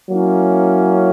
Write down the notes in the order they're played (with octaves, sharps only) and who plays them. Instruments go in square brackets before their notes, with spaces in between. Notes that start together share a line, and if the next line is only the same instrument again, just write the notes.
[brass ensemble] F#3 A#3 C#4 E4